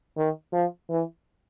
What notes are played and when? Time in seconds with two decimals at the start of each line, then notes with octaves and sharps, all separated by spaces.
0.17 D#3
0.53 F3
0.90 E3